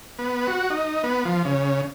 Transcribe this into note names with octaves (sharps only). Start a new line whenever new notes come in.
B3
F#4
D#4
B3
F3
C#3